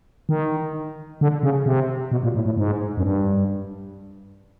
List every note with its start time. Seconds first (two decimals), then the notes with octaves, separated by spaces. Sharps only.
0.29 D#3
1.21 D3
1.43 C#3
1.66 C3
2.12 B2
2.23 A#2
2.35 A2
2.46 A2
2.58 G#2
2.97 F#2
3.03 G2